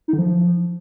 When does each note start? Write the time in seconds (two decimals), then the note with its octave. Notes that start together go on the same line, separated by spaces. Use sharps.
0.08 D#4
0.13 D3
0.18 F3